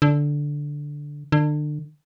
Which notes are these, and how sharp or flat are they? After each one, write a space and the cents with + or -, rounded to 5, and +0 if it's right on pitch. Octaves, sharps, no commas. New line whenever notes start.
D3 -5
D3 +30